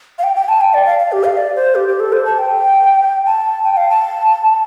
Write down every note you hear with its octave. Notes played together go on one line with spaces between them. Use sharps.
F5
G5
G5
A5
G5
D5
F5
F5
G4
F5
D5
C5
G4
G4
A4
C5
A5
G5
A5
G5
F5
A5